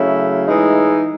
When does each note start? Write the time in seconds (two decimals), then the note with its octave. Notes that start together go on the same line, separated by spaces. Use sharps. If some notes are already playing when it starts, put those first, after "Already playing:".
Already playing: C#3 F#3 A3 E4
0.47 A2 E3 G#3 D#4